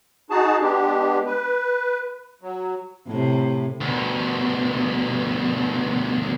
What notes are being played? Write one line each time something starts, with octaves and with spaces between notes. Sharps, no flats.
D#4 F#4 G#4 A5
G#3 B3 D4 G4
B4
F#3
A2 C3
D2 B2